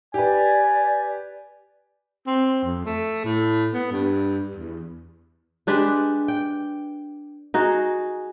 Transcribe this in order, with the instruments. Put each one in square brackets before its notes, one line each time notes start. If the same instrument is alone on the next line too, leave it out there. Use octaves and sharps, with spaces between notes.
[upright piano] G4 B4 [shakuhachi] D5 [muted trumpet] G#5
[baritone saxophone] C4
F2
A3
A2
B3
G2
E2
[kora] G#3 D4 G4 B4
G5
D#4 F#4 G#4